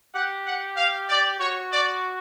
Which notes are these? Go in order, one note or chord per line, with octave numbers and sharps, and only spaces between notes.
G4 F#5
F#5
F5
D5
F#4 C#5
D5